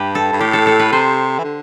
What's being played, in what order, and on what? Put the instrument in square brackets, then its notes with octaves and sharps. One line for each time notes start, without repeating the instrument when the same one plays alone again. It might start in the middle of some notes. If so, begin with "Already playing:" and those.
Already playing: [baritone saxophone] G2 [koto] G4 B4
[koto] A4
[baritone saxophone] G2
[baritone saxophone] A2 [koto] G4
[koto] A4
A4
B4
[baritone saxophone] C3 [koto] C5
[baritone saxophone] E3
D3